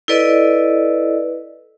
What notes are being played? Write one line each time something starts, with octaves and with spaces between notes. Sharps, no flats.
E4 A4 B4 D5 D#5